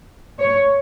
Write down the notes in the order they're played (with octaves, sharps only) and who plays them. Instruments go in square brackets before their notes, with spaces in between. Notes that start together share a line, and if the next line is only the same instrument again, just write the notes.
[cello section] C#5